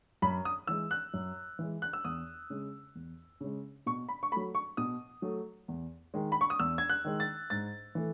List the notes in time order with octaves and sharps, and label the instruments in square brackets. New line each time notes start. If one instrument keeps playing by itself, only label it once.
[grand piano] F#2 B5
D#6
E3 G#3 E6
F#6
F#2
E3 G#3
F#6
E6
E2 D#6
C#3 G#3
E2
C#3 G#3
B2 C#6
B5
C#6
A3 B5
F#3
C#6
B2 D#6
F#3 A3
E2
D#3 G#3
B5
C#6
D#6
E2 E6
G#6
F#6
D#3 G#3
A6
G#2 A6
E3 A3